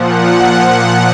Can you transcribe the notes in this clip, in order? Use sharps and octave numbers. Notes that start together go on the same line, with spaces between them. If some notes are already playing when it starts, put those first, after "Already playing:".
Already playing: A#2 F3 F#5